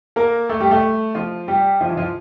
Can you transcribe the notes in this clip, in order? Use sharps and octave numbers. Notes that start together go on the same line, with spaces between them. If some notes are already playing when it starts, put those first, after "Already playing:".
A#3 A#4
A3 A4
G3 G4
A3 A4
F3 F4
G3 G4
F3 F4
E3 E4
F3 F4